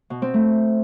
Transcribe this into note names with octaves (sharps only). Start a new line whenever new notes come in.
B2
C4
A3